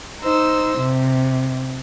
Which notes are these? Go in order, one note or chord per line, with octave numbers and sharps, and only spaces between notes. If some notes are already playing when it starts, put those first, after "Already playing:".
D#4 C5 E6
C3